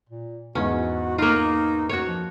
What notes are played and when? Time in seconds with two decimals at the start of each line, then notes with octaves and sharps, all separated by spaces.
0.09 A#2
0.55 E2 G#2 C#4 F#4
1.18 A#3 D#4 F4
1.89 F#2 F#4 C#5
2.07 F3